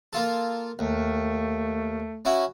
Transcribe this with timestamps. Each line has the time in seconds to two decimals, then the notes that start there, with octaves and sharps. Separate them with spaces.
0.13 A#3 F4 A4
0.79 D#2 A3
2.25 C#4 E4 F#4